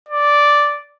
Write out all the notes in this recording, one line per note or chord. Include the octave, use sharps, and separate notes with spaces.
D5